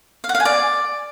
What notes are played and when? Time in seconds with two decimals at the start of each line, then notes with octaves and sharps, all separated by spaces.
0.24 F5
0.29 F#5
0.35 F5
0.40 G#5
0.45 D5